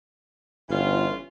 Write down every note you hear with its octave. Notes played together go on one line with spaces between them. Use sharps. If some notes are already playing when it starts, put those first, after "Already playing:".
G1 E3 C#4 F4